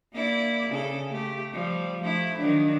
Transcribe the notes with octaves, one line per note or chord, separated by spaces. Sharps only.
A#3 E4 D5
C#3 A4
A3 G4
F3 G3
F3 A3 E4
D#3 F#3 D4